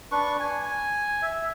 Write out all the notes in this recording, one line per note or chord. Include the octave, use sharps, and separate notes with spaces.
D4 B4 C#6
G#5
G#5
E5